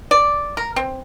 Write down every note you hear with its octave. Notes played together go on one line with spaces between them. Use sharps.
D5
A#4
C4